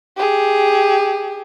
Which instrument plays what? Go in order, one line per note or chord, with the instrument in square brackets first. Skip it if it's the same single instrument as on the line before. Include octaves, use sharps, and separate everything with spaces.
[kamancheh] G4 G#4